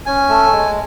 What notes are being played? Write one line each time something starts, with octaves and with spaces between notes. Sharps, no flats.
C#4 G#5
A3
G#3